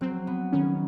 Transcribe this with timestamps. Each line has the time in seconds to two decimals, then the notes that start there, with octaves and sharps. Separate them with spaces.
0.01 F#3 C4
0.27 B3
0.52 D#3 C#4